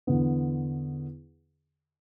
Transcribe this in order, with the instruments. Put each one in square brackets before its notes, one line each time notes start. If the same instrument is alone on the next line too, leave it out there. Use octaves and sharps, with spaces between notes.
[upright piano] E2 D3 B3